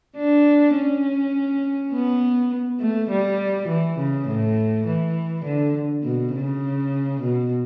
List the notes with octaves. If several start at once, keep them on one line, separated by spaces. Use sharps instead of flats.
D4
C#4
B3
A3
G3
E3
C#3
A2
E3
D3
B2
C#3
B2